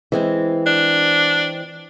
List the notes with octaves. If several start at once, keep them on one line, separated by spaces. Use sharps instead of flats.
E3 G#3 C4
D4